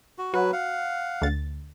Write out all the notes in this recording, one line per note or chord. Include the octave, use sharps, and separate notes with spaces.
F#4
F#3 F#4 B4
F5 F#5
D2 A6